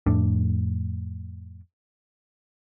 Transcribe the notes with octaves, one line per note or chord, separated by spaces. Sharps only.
F2 A2 D4